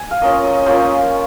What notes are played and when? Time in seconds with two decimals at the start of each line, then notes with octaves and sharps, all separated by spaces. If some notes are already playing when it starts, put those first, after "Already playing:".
Already playing: G#5
0.11 F5
0.22 A#3 C#4 F4 D#5
0.44 D#5
0.66 A#3 C#4 F4 C5